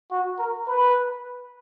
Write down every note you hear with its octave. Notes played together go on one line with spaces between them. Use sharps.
F#4
A#4
B4